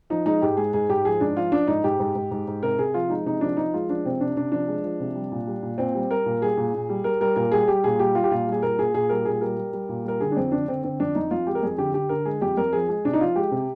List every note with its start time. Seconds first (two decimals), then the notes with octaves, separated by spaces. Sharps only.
0.10 F3 D#4
0.26 G#3 D#4
0.42 G#2 G4
0.57 G#3 G#4
0.73 G#2 G#4
0.89 G#2 G4
1.05 F3 G#4
1.21 G#2 D4
1.37 F3 F4
1.52 F3 D4
1.67 G#2 D#4
1.84 G#2 G4
2.00 G#2
2.15 G#2
2.31 G#2
2.47 G#2
2.62 C3 A#4
2.78 C3 G#4
2.94 F3 F4
3.10 G#3 D#4
3.26 C3 D#4
3.41 F3 D4
3.57 F3 D#4
3.74 G#3 F4
3.89 F3 D4
4.05 C3 C4
4.21 C3 D4
4.36 C3 D4
4.52 F3 D4
4.68 G#3
4.84 F3
5.00 C3
5.15 G3
5.32 A#2
5.47 G3
5.63 A#2
5.78 A#2 C4
5.95 G3
6.10 G3 A#4
6.26 A#2
6.41 G3 G#4
6.57 A#2
6.74 A#2
6.89 G3
7.04 G3 A#4
7.20 G3 A#4
7.36 A#2 A#4
7.52 G3 G#4
7.68 G3 G4
7.84 A#2 G#4
7.99 G3 G4
8.15 G3 F4
8.24 G4
8.31 A#2 F4
8.47 G3 G#4
8.63 A#2 A#4
8.78 A#2 G#4
8.94 A#2 G#4
9.09 G3 A#4
9.25 A#2 G#4
9.41 G3 A#4
9.57 G3
9.73 G3
9.89 A#2
10.04 G3 A#4
10.20 D3 G#4
10.32 D4
10.37 F2 C4
10.52 D3 D4
10.67 D3 C4
10.83 D3 C4
11.00 F2 D4
11.15 F2 D#4
11.31 F2 F4
11.47 G#3 G4
11.55 A#4
11.63 F2 G#4
11.78 D3 G4
11.94 D3 G4
12.09 D3 A#4
12.25 G#3 G#4
12.42 F2 G4
12.57 F2 A#4
12.73 F3 G#4
12.89 G#3 G#4
13.05 C3 D4
13.14 D#4
13.21 F3 F4
13.36 G#3 G4
13.51 C3